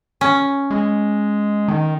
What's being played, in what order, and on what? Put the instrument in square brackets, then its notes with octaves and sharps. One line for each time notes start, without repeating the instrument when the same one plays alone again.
[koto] C#4
[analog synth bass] G#3
D#3